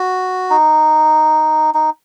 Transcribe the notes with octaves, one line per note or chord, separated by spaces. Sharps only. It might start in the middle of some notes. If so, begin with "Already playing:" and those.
Already playing: F#4
D#4
D#4